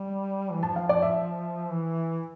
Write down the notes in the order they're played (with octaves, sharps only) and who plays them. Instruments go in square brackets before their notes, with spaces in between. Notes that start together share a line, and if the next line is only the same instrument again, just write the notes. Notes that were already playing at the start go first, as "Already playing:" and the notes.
Already playing: [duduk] G3
E3
[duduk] F3 [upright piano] A5
[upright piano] F5
D5
E5
[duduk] E3